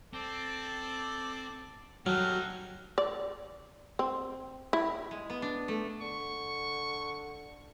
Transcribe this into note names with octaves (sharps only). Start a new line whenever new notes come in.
C4 A4 D5
F#3 G3 D#4 F#4 A4 F6 F#6
D5
C4
E4
G#3
B3
D4
A3
D3 C#6